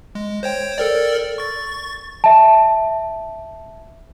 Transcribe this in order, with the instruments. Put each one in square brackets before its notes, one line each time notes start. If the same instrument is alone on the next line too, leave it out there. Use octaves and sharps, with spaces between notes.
[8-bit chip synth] G#3
C5 C#5 G5
A4 A#4 D5
C#6 A6
[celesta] E5 A5